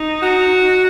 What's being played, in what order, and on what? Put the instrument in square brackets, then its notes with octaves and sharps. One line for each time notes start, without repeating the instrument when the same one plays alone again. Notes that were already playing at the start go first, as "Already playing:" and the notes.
Already playing: [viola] D#4
[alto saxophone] F#4